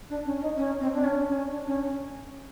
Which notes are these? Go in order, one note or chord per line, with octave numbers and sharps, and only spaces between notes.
D4
C#4
D#4
C#4
C4
D4
C#4
C#4
D4
C#4
C#4